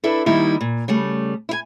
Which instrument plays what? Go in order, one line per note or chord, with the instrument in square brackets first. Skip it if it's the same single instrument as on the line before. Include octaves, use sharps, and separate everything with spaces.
[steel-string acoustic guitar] D4 E4 A4 B4
D#3 G3 A#3 D#4 E4
A#2
C#3 G3 A3
E4 G#5